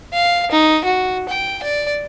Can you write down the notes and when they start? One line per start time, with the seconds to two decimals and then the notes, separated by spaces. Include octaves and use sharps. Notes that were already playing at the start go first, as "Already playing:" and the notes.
0.14 F5
0.52 D#4
0.85 F#4
1.29 G5
1.63 D5